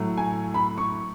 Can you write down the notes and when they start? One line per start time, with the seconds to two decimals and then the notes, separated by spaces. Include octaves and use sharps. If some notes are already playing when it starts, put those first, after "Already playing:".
Already playing: A2 F#3 A3
0.17 G#5
0.54 B5
0.78 C#6